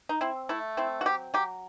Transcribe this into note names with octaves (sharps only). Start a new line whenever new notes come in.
D#4
C4 E4
A3 E4
C4 E4
F#4
F#3 G4
F#3 G4